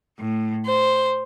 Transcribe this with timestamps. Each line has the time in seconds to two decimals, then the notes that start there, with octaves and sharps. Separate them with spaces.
0.18 A2
0.65 C5